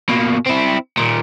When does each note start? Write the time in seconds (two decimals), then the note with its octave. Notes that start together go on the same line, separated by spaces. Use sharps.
0.09 B2 A#3
0.47 C4 E4
0.97 A#2 D#3